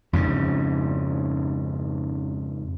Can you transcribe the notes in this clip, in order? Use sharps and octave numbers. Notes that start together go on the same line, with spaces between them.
F2 G#2 C#3